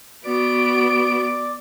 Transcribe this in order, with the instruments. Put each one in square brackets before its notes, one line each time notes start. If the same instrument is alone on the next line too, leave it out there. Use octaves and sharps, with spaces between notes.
[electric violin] B3 D7 [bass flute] F#4 [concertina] D5